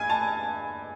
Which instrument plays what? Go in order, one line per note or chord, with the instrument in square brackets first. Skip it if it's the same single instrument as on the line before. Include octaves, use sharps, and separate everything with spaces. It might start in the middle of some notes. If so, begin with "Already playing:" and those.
Already playing: [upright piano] G2 G#5
A5